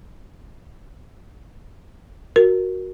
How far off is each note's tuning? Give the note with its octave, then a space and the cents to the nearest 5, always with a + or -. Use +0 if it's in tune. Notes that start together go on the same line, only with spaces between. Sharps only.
F#4 +0 A#4 +0